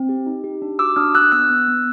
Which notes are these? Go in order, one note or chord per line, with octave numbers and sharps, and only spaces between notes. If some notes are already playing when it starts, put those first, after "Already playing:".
Already playing: C4
G4
D#4
G4
D4
F#4 D6 E6
D4 D#6 F6
D4 E6 F#6
B3 E6 F#6
B3
B3